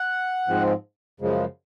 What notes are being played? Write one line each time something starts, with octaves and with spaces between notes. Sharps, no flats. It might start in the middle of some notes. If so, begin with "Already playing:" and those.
Already playing: F#5
G#2 F3 G#3 C4
F#2 C#3 F3 G#3